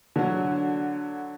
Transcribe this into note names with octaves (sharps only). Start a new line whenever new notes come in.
D3 F#3